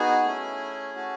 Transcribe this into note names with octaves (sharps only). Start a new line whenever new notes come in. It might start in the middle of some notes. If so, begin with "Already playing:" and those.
Already playing: B3 D#4 F#4 G#4 G#5
A3 C#4 E4
C#4 F#4 A4